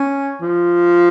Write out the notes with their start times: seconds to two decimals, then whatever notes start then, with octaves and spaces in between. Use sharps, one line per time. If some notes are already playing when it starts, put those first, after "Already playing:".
Already playing: C#4
0.41 F3